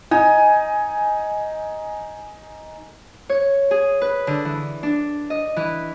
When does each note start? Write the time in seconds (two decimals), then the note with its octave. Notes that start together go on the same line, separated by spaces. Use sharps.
0.11 D#4 G#5
3.29 C#5
3.71 G#4
4.01 B4
4.27 D3
4.45 E3
4.83 D4
5.30 D#5
5.56 E3